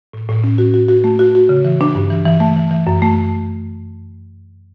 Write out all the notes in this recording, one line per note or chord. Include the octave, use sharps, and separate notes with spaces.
A2
A2
C#4
F#4
F#4
F#4
A3
F#4
F#4
C#3
E3
D4
G2
E3
E3
A3
E3
E3
F#2
A3